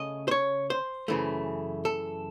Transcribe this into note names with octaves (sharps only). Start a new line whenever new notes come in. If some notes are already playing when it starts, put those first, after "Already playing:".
Already playing: C#3 A3 C#4 D#5
C5
C#5
C5
F#2 C#3 E3 A3
A4